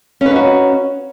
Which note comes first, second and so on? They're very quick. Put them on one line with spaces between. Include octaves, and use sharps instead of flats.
C#4 B4 D#4 F#4